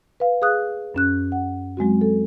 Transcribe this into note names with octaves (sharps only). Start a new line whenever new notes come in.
B4 F5
G#4 F5 D#6 F#6
F#2 C#4 F#6
F#5
F#3 G#3 C4 F#4
A4